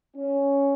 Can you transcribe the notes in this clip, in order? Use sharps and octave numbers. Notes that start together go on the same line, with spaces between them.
C#4